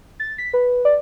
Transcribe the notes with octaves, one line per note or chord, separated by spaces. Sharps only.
A6
B6
B4
D5